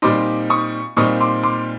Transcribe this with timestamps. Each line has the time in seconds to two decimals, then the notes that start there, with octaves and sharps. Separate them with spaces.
0.02 A#2 G3 C4 D#4 C6 D6
0.50 C#6 D#6
0.97 A#2 G3 C4 D#4 C#6 D#6
1.21 C6 D6
1.43 C6 D6